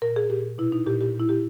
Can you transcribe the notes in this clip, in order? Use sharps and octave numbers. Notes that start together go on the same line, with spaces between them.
A#2 A#4
G#4
A#2 G4
B2 E4
D#4
A#2 G4
G4
A#2
E4
G4